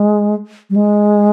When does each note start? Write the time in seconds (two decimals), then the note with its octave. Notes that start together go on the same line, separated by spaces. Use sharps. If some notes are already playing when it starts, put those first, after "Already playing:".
Already playing: G#3
0.70 G3
0.76 G#3